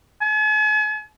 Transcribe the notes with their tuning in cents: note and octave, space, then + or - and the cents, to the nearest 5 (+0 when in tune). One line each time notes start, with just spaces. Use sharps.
G#5 +45